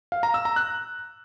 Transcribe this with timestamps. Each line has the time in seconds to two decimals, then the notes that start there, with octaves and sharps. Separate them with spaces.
0.12 F5
0.23 A#5
0.34 E6
0.45 A#5
0.56 F#6